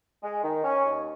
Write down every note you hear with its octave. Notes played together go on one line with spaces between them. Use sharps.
G#3
D#3
C#4
D#2